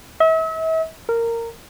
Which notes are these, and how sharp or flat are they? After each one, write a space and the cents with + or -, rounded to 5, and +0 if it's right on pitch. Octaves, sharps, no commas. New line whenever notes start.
E5 -40
A#4 -15